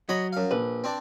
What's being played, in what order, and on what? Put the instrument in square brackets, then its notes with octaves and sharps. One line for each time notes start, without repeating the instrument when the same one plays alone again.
[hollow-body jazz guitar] F#3 [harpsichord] C#5 D#5 B5
[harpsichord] F#2 F5
[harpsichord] A#1 [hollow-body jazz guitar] B4
[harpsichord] C4 D4